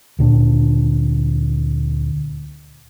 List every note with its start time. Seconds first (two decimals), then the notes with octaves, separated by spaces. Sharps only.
0.19 D2 A#2 D4